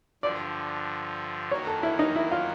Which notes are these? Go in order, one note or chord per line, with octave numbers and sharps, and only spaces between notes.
G2 D3 F3 D5
F#2 D#3 F#3 A#3 C#5
A4
E4
D#4
E4
F4